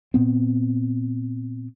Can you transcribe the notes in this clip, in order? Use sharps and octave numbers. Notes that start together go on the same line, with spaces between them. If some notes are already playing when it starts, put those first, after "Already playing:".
A#2 B3 C4